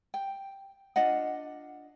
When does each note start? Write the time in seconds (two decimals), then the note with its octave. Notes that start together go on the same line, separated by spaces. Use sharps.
0.14 G5
0.96 D4 F4 D#5 F#5